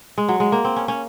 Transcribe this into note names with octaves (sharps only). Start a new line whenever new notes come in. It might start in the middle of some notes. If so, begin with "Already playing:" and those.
G#3
F#3
G#3
A#3
C4
C#4
C#4